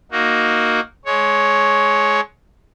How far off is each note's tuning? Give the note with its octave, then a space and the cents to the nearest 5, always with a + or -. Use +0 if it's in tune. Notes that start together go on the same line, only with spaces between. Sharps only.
A#3 +0 D#4 +0 F#4 +0
G#3 +25 C#5 +0